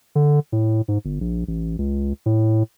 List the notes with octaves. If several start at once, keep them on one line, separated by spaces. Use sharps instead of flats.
D3
A2
G#2
G1
A#1
A1
C#2
A2